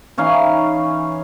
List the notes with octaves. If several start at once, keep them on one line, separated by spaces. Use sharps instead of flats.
E3 C#4 D#4 F5